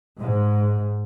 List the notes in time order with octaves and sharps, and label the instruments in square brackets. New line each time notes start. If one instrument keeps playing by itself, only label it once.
[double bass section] G#2